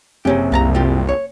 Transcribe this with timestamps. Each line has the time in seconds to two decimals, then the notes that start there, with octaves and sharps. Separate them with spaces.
0.25 F#1 C3 A#3 C#4 G4
0.52 C2 A#3 A5 A#5
0.75 C4 F4 G4
1.09 C#5